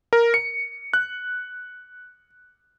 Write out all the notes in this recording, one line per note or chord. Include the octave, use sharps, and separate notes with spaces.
A#4
C#7
F#6